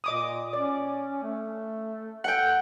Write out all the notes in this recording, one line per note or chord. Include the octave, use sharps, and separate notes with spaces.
A#2 D#5 D6 D#6
C#4 D5
A3
A4 F#5 G5